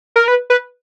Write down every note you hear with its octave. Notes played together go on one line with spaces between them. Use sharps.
A#4
B4
B4